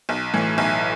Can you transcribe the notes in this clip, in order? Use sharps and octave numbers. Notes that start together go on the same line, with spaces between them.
B1
A2 E3
B1